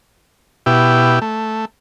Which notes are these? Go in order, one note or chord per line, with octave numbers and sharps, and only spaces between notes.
B2 E4 G4
A3